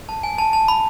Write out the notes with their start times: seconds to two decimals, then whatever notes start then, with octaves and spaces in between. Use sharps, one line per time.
0.09 A5
0.23 G#5
0.38 A5
0.53 A5
0.68 B5